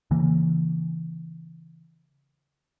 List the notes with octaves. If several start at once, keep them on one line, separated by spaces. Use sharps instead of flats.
C#3 E3 A#3